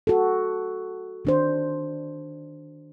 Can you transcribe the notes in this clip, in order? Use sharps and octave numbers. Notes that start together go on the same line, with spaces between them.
F#4 A4
D#3 D4 C5